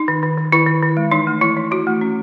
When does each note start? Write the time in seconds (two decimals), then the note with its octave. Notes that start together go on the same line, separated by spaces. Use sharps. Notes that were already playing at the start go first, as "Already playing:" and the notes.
Already playing: D#4
0.08 D#3
0.23 D#3
0.38 D#3
0.52 D#3 E4
0.67 D#3
0.83 D#3
0.97 G#3
1.11 E3 D#4
1.27 A3
1.41 E3 E4
1.56 E3
1.71 E3 F#4
1.87 A3
2.01 C#4